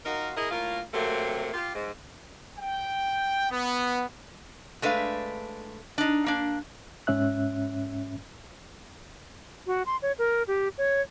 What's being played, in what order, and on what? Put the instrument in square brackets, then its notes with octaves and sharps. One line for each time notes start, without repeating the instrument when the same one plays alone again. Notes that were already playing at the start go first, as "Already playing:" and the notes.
[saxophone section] D#4 F4 F#4 A#4
E4 G#4 A#4 D#5
A2 A#3 F4 A#4
C3 F#3 A3 A#3 C4
F4 G4
G#2
[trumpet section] G5
B3
[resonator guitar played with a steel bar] G#3 A3 D4 B4 F5
D4 D#4
A#3 D4
[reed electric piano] G#2 C#4 E5 F#6
[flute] F#4
C6
C#5
A#4
G4
C#5